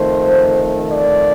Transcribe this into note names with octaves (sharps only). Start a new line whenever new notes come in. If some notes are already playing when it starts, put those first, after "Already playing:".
Already playing: F2 D#3 A3 C5
D5